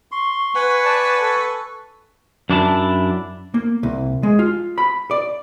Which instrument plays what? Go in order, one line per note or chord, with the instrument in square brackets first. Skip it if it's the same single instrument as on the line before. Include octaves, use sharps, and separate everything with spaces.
[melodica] C6 [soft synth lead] C#6
[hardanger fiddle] B4 [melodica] F#5 G#5
[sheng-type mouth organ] D5 A5
A4
[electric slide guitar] F#2 D4 E4 A5
[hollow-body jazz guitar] A#3
C2
G#3
F4
B5
D5